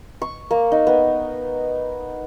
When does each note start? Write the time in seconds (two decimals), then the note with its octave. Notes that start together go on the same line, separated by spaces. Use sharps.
0.22 C#6
0.51 A#3
0.72 D#4
0.87 B3